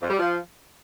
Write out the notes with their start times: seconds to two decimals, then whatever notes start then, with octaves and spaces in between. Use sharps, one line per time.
0.01 F2
0.10 G3
0.18 F3